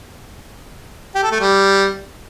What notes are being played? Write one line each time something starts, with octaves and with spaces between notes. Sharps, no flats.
G4
A4
A3
G3